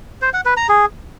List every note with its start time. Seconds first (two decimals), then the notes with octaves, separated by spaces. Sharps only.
0.22 C5
0.34 F#5
0.45 B4
0.57 A#5
0.69 G#4